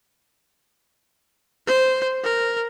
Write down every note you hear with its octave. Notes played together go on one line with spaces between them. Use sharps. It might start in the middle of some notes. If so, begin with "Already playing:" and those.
C5
A#4